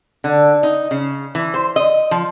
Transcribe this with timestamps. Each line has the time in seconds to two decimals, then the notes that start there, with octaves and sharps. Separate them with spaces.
0.24 D3
0.63 D#4
0.91 C#3
1.35 E3
1.54 C5
1.76 D#5
2.11 F3